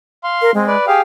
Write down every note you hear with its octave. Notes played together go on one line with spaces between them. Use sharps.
F5 C6
A#4
G#3 C4
B4 D5
G4 G#4 F5 G5